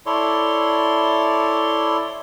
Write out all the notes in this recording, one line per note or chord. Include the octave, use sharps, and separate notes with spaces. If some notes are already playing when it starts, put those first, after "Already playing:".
E4 A4 C#5 D5 C6